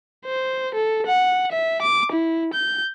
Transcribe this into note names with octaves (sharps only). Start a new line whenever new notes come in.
C5
A4
F#5
E5
D6
E4
G6